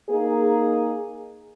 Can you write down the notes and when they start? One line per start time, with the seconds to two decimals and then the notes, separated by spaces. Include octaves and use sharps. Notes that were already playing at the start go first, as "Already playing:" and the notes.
0.10 A#3 D#4 G#4